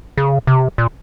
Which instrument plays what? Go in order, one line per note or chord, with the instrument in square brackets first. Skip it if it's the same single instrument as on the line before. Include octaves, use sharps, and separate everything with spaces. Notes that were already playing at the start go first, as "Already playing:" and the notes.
[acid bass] C#3
C3
A#2